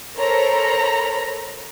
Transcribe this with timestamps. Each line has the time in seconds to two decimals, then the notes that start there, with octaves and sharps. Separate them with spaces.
0.16 A4 A#4 C5 C#5 A#5 B5